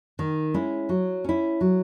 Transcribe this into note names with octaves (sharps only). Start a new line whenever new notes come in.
D#3
G#3 C#4 E4
F#3
C#4 E4
F#3